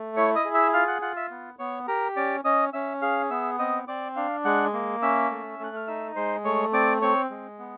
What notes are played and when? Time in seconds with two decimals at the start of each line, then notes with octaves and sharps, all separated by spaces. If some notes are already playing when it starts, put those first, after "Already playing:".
Already playing: A3
0.17 E4 C#5 C#6
0.35 D#5 D#6
0.45 G#4
0.54 E5 E6
0.73 F4 F5 F6
0.88 F#5 F#6
1.02 F4 F#5 F#6
1.17 E5 E6
1.31 B3
1.59 B3 C#5 C#6
1.88 G4 A#4 A#5
2.16 C#4 D5 D6
2.45 C#4 D#5 D#6
2.73 C#4 E5 E6
3.02 G#4 F5 F6
3.30 B3 E5 E6
3.59 C4 D#5 D#6
3.88 C4 D5 D6
4.16 D4 F5 F6
4.45 G#3 F#5 F#6
4.73 A#3
5.02 C#4 E5 E6
5.31 A3
5.59 A3 F#6
5.76 F6
5.87 D#4 E5 E6
6.16 G#3 C5 C6
6.44 A3 C#5 C#6
6.73 C4 D5 D6
7.02 C4 C#5 C#6
7.30 G#3
7.59 B3